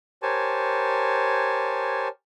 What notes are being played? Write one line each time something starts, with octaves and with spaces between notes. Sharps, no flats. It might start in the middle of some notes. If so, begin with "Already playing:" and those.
G4 A#4 C5 C#5 G#5 A5